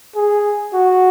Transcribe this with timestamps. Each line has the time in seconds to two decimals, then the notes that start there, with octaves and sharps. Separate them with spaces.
0.16 G#4
0.73 F#4